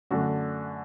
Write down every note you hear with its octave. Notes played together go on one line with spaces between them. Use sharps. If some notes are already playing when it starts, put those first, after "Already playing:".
F#2 D3 A3 D4 F#4